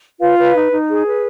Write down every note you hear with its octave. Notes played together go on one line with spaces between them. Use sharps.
F4 B4 F5
B4
D#4
D#4
G#4
B4